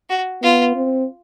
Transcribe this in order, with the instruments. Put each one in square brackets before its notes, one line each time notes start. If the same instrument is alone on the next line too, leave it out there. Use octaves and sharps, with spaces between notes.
[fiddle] F#4
[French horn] B3 [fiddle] F4
[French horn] C4